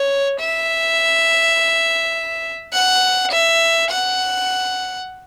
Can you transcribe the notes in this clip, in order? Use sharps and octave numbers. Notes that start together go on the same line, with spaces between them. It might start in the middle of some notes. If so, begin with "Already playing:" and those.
Already playing: C#5
E5
F#5
E5
F#5